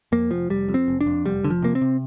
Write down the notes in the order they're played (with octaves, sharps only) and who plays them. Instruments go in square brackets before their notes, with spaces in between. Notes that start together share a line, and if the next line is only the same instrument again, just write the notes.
[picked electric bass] F2 A#3
F1 F3
F1 G3
F2
C4
F1
D4
F2
F1 G3
F1 D3
F3
C3 A#3
C4
C3